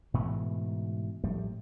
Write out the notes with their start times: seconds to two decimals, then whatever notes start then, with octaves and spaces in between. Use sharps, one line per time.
0.14 G#2 B2 E3 A3
1.24 A2 F3 G3 A3